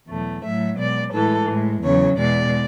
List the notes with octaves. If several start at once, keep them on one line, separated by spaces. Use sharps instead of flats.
E2 B2 F#3 A3
A2 F#3 A3 E5
B2 G#3 D5
A2 E3 G#3 A4
A2 G#3
E2 C#3 F#3 C#5
E2 B2 G#3 D5